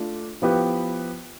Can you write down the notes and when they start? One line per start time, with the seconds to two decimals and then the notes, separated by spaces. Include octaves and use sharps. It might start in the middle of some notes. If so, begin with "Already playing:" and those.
Already playing: A3 D4 F4
0.42 F3 B3 E4 G4 B4